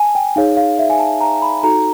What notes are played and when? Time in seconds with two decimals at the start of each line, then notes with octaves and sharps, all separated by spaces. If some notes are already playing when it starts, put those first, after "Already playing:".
Already playing: G#5 A5
0.15 G5
0.36 D#4 G#4 C#5 F5
0.57 F5
0.79 E5
0.90 G#5
0.99 A5
1.21 A#5
1.42 B5
1.63 D#4 F#4 A4 A#5